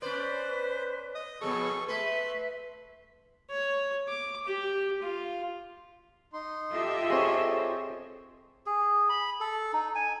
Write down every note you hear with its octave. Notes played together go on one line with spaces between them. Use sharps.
C#4 B4 C5 D5
D#5 D#6
B2 F3 B3 G#4 A4 C#6
A3 B4 E5 C6
C#5
D6
G4
F4
D#4 C6
F4 G4 A4 D#5 E5
C4 G#4 C#5 C6
C5 C#5
G#4
B5
A4
D#4
G#5